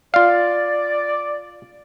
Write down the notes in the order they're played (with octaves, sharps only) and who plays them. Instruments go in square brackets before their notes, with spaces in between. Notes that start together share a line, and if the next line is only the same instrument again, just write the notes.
[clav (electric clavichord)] F4 F5 [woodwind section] D5